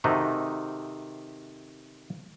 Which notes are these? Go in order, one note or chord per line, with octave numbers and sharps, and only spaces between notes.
C3 D#3 A3 D#4 F#4